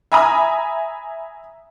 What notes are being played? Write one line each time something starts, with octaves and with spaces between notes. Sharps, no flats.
E5 G#5 A#5 B5 D#6